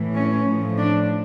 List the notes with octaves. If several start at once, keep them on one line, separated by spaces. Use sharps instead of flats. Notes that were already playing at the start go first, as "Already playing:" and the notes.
Already playing: A2 E3
C#4
A2 F3
D4